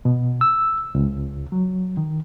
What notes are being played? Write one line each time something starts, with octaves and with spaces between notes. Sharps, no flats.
B2
E6
C#2
F#3
D#3